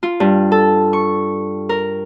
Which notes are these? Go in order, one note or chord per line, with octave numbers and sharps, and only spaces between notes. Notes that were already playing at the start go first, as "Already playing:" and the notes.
F4
G2
A4
C#6
A#4